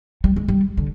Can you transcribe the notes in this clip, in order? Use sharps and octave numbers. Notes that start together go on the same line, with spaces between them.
G3
G#3
G3
D3